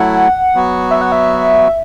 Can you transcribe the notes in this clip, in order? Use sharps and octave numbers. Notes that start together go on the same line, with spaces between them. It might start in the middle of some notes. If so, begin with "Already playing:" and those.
Already playing: F#3 A3 E4 F#5
F#3 B3 F#4
E5
F#5
E5